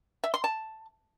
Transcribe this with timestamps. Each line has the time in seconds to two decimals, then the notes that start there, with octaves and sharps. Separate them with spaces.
0.24 E5
0.34 C6
0.44 A5